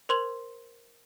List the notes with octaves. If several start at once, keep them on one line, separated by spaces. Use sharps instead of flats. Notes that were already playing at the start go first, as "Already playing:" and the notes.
A#4 C5 C6 G#6 F7 F#7